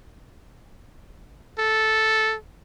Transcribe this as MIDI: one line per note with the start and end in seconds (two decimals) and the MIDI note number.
1.59 2.36 69